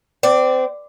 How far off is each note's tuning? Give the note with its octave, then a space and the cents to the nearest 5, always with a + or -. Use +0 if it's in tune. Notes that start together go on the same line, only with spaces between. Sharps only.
C4 -25 D5 +0